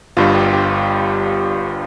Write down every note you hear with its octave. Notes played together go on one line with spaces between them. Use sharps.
G1 G2 G3 F4
G4
G4